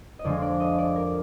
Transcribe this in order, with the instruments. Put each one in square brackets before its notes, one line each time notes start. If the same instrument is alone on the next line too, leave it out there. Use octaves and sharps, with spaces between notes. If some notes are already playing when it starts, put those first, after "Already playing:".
[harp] D#5
F2 D3 F3 G#3 D5
D5
D#5
D5
A#4